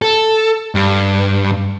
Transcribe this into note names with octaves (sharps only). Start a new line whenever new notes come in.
A4
G2